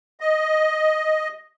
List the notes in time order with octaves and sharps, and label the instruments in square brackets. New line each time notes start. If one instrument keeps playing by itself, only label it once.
[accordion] D#5